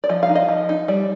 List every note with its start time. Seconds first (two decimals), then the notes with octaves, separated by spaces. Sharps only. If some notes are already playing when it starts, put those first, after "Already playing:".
0.04 D5
0.09 F3 D#5
0.23 F5
0.29 D#4
0.35 D#5
0.49 F3
0.69 D#4
0.88 G3 D5